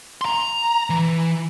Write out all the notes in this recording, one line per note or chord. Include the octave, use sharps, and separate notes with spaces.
A#5 C6
E3